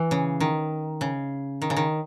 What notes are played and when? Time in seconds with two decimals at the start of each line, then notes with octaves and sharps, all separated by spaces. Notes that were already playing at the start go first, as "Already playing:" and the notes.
Already playing: E3
0.11 C#3
0.40 D#3
1.01 C#3
1.62 D#3
1.70 C#3
1.77 D#3